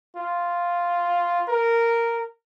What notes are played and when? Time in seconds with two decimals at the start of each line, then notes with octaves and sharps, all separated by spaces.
0.17 F4
1.48 A#4